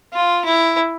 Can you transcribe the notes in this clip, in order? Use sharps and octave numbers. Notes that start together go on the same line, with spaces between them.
F4
E4